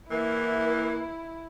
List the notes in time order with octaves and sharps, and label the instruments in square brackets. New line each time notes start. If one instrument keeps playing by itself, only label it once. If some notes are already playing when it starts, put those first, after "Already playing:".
[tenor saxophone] E3 [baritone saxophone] A#3 [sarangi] E4 [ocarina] A#4